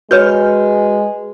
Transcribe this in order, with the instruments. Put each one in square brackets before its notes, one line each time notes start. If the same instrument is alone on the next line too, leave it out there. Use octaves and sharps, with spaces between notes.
[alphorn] G#3 [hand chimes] F#4 B4 [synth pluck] C#5 F6 G6